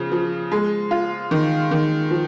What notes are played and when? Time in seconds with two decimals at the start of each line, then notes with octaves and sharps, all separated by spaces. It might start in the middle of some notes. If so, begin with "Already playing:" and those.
Already playing: C#3 F3
0.12 F3
0.52 G#3
0.91 F4
1.31 D#3
1.71 D#3
2.11 F3